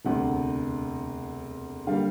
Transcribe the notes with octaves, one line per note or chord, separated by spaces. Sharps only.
E1 D2 C3 F#5
D3 G3 A#3 F5